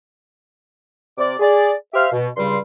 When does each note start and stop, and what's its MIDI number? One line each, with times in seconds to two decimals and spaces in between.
1.18 1.34 48
1.18 1.34 74
1.18 1.34 86
1.39 1.73 68
1.39 1.73 74
1.94 2.07 67
1.94 2.07 72
1.94 2.07 76
1.94 2.07 77
1.94 2.07 89
2.12 2.28 47
2.37 2.57 37
2.37 2.57 43
2.37 2.57 49
2.37 2.57 55
2.37 2.57 84